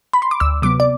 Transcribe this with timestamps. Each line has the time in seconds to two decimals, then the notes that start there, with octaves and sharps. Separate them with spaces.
0.13 B5
0.22 C6
0.31 D6
0.40 D2 E6
0.62 C3 F#3 B3 D6
0.80 D5